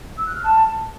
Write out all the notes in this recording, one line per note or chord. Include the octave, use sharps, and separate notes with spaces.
E6
F#6
F6
A5